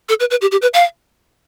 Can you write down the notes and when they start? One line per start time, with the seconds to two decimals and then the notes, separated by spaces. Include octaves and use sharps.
0.09 A4
0.20 B4
0.31 B4
0.41 G4
0.52 G4
0.62 B4
0.74 F5